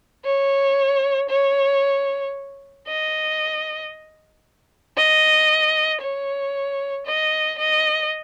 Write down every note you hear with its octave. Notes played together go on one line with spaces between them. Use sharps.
C#5
C#5
D#5
D#5
C#5
D#5
D#5